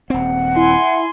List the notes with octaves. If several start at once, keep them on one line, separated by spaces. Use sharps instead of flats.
D#1 C4 F#5
E4 G#5 C6